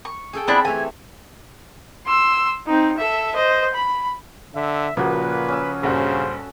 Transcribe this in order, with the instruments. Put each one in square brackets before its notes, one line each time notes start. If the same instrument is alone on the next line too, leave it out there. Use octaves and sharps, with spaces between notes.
[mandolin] C#6
[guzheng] G#4 A4 G5
[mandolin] B3 D4 E4 [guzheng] C4 G4
[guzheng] E3 A3 [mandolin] G#5
[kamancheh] C6 E6
C4 D#4
A4 E5
C5 D#5
B5
[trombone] D3 [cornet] E5
[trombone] A#2 [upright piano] C#3 F3 [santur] A#3 F#4 [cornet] B4
[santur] C#4 D#6 E6
[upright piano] A#1 G2 F#4 [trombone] C#3 [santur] A4 [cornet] C5